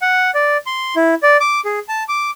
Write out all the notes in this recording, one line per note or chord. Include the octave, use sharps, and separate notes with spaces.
F#5
D5
C6
E4
D5
D6
G#4
A5
D6